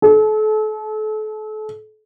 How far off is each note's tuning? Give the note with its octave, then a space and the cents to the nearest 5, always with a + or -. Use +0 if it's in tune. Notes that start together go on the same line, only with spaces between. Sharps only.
A4 -35